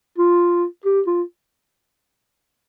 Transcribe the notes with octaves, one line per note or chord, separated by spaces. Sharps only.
F4
G4
F4